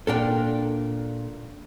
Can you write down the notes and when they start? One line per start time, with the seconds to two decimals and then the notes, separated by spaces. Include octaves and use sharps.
0.07 A#2 D4 A4 A#4 D5 G5